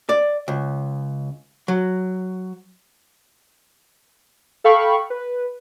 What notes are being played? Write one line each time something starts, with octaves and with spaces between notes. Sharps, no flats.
D5
C#2
F#3
A4 F5 G5 B5 C#6
B4